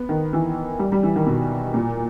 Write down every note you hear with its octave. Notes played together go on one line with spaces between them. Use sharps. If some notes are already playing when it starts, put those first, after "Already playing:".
Already playing: B3
D#3
E3
G3
G3
E3
D#3
B2
A#2